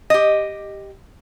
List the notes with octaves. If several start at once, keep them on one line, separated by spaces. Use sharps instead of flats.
G4 D#5